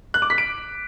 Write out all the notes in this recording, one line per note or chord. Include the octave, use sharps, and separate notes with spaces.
F#6
D6
B6
D7